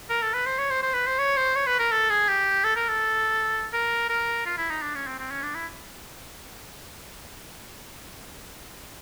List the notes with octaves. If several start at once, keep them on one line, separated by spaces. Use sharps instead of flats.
A#4
A4
B4
C5
C#5
C5
C5
B4
C5
C#5
C5
C#5
B4
A#4
A4
G#4
G4
A4
A#4
A4
A#4
A#4
F4
E4
D#4
D4
C#4
C4
C4
C#4
D4
E4